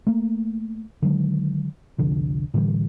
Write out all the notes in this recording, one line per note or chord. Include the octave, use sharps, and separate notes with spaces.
A3 A#3
D3 D#3 F#3 G#3
F1 C2 D3 F3
A2 D3 E3 G3